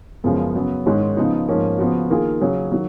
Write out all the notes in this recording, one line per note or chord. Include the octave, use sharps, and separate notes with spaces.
F#2 C#3 F3 G#3 B3
C#3 F#3 B3
G#2 D#3 G#3 C#4
C#3 F3 B3 D#4
G#2 F3 A#3 C#4
C#3 F3 B3 F#4
D#3 A#3 F4 G#4
C#3 F#3 C#4 G#4
D#3 F#3